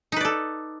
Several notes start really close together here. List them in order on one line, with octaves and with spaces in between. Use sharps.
D#4 B4 D5 A4